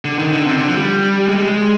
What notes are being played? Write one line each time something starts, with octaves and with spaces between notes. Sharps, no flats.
D3
D#3
D3
C3
D3
F3
G3
G#3
G3
G#3